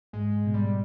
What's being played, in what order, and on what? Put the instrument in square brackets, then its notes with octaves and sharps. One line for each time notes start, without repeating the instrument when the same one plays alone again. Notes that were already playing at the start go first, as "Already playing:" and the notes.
[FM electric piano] G#2 [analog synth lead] G#3
[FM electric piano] B2
[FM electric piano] G#2 [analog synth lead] G3